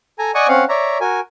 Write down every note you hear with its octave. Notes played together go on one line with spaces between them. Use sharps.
A4 G#5 A#5
D5 D#5 F#5 G#5 C#6 D#6
C4 C#4 F5 F#5
C#5 D5 E5 A#5
F#4 A#4 G#5